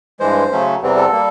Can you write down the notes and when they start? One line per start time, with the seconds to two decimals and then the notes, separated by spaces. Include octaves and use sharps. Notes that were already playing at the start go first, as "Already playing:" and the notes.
0.20 G2 E3 G#3 C5
0.51 C#3 F#3 A3 C#4
0.82 E2 C3 E3 G3 C4
0.97 A4
1.12 G3 A#3